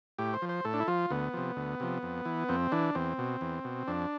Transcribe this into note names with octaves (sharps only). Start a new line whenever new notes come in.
A2 G4
C5
F3
C5
A2 A4
D4
E4
F3 F4
D2 B3
C3 F3
D2
C3 F3
F2
E3
F2 C4
E3 D4
E2 C4
B2
E2
B2
F2 D4